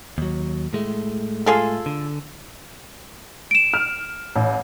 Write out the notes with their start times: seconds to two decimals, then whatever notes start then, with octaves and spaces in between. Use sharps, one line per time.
0.18 D#2 F#3
0.73 A2 G#3 A3
1.46 F4 G#4 A4
1.86 D3
3.51 D7 E7
3.74 F6
4.36 A1